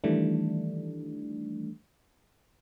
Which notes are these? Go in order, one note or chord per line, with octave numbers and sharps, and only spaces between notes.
D#3 E3 G3 A3 D4